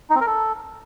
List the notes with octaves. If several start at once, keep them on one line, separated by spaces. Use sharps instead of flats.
D#4
C4
A#4
A4